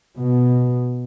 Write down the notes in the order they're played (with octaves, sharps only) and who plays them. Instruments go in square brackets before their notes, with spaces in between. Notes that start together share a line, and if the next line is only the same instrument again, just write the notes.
[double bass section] B2